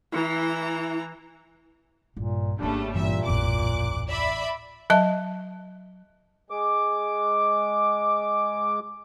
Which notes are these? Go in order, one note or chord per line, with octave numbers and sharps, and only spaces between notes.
E3 E4 A#5
A#1 G2 A#2
G#1 C#3 G3 A3 A#3 D4
G2 A#2 E3 E5
D1 A1 F2 G#2 D6 F#6
D5 E5 B5
F#3 D#5 E5 A5
G#3 D6